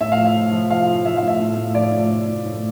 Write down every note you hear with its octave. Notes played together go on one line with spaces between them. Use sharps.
A2 E5
F5
F3
E5
F3
F3
F3 F5
F3
F3 E5
F5
A2 E5
A2
A2
F3 D5
A2
A2
A2
A2